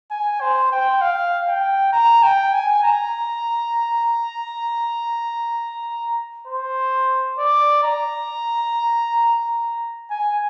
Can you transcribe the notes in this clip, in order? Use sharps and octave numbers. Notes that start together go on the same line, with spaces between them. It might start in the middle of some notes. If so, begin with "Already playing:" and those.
G#5
C5
G5
F5
G5
A#5
G5
G#5
A#5
C5
D5
A#5
G#5